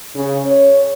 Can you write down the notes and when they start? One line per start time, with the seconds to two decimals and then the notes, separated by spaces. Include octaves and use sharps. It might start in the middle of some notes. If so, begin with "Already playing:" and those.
0.15 C#3
0.46 C#5